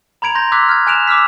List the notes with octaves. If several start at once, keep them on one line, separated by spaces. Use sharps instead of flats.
A#5 B5 G#6 D7 F7
C6 G6 A#6
C6 D6 E6 F#6 G#6 B6
F6 G#6
G#5 F#6 D7 E7 F7
D6 E6 F6 B6